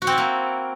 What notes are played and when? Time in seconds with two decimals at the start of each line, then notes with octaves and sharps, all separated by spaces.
0.02 F#4
0.07 C4
0.12 E4
0.18 A#3